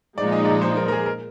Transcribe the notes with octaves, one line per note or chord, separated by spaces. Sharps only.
A#2 F3 G#3 D#4 D5
D#5
D5
C5
A#4
A#4
G#4
A#4